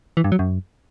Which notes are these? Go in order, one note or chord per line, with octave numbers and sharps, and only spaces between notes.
E3
G2
F#3
F#2